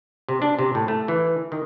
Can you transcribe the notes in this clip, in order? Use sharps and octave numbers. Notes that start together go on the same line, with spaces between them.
C3
D4
C3
A2
A3
E3
D#3